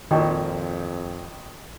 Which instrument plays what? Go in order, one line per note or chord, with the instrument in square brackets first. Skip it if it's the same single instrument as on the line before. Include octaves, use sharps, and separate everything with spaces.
[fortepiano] G#1 A#2 [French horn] F2 [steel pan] D#3 [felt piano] D#5 G5 C#6